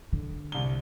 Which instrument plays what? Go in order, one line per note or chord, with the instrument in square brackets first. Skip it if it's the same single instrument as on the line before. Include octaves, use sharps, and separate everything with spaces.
[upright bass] D3
[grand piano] C2 G7